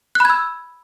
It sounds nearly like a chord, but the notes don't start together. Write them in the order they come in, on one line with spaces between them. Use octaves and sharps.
F#6 B5 G#6 E6